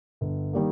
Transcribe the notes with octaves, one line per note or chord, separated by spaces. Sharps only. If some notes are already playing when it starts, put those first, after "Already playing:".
G1
D#3 G3 A#3